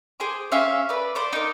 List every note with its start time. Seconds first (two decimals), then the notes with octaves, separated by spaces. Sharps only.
0.20 G#4 C5 G#5 D6
0.52 C#4 E5 F5 G#5
0.89 B4 D5
1.15 C5 D5 D6
1.33 D#4 A#4